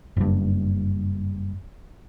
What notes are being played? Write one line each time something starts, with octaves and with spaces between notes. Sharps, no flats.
F#1 G2